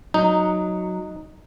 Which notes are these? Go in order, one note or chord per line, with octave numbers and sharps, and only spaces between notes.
F#3 D#4